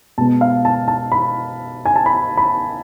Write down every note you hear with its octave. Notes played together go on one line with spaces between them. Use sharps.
B2 G#3 B3 A5
F5
A5
A5
B5
G#5
A5
B5
B5